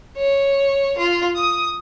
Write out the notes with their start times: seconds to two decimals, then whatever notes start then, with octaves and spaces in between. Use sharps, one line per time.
0.17 C#5
0.98 F4 C7
1.35 D#6